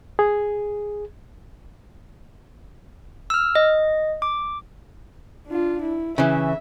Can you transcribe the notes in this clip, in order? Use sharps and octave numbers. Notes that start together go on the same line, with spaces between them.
G#4
E6 F6
D#5
D6
D4 F4
E4
C#3 E3 E5